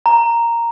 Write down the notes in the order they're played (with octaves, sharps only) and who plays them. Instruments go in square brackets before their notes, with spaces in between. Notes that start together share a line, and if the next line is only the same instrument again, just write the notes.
[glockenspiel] A#5